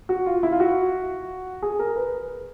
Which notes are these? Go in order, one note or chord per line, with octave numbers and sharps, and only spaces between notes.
F#4
F4
E4
F4
F#4
G#4
A#4
B4